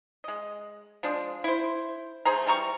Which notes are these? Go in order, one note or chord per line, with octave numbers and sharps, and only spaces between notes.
G#3 D#5
F3 G#3 D4
E4 C5
A3 G#4 C5 A#5
E3 G3 A#5 C#6